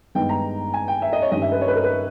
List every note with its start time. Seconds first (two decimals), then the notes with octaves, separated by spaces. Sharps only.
0.15 G2 D#3 G#3 B3 G5
0.29 A#5
0.74 G#5
0.88 G5
1.02 E5
1.13 D#5
1.22 C#5
1.32 G2 D#3 G3 C#4 D#5
1.42 E5
1.52 B4
1.61 C#5
1.68 B4
1.76 A#4
1.84 B4